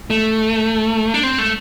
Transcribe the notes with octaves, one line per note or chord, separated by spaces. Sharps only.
A3
D4
C4
A3